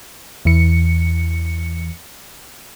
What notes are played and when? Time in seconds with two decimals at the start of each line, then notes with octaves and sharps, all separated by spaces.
0.45 E2 E3 C#7